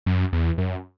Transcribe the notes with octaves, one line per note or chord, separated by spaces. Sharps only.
F#2
E2
F#2